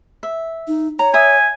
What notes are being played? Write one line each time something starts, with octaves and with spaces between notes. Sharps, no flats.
E5
D#4
C#5 A#5
E5 G#5 D#6